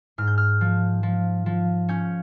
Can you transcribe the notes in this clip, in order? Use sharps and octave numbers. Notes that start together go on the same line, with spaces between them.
G#2 F6
G6
F6
F3
F3
F3
C#4 G6